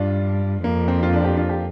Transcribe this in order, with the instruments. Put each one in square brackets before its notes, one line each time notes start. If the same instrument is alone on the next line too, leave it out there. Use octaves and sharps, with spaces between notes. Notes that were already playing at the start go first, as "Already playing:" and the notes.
Already playing: [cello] G2 [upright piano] D4 F4
[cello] F2 [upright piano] A#3
[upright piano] C4
F4
D4
G4
F4
G4